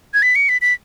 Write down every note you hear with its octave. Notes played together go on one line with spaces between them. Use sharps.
G#6
B6
C#7
B6
B6